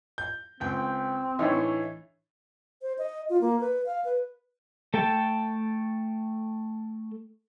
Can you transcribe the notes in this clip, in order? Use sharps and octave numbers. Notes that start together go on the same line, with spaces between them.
G6
C#2 C4 G5
A2 E3 D4 D#4 C#5
C5
D#5
F4
A#3
B4
F5
B4
A3 A4 G5 A5